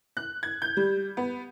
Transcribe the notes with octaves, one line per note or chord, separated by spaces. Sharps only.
F#6
G#6
G6
G3
B3